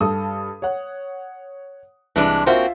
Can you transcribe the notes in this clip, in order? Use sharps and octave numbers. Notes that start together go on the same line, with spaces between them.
G2 A4 D#6
C#5 F#5
C2 E3 G#3 D4
A#3 C4 F4 F#4 C5 E5